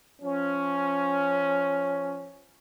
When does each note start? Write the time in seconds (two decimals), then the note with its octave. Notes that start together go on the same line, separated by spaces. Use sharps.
0.22 F3 C#4